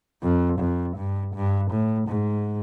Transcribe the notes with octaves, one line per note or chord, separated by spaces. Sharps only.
F2
F2
G2
G2
A2
G#2